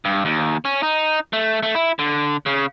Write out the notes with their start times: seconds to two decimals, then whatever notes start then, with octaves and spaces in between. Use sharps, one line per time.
0.05 G2
0.25 D#2
0.65 C#4
0.83 D#4
1.33 A3
1.63 A3
1.75 E4
1.99 D3
2.46 C#3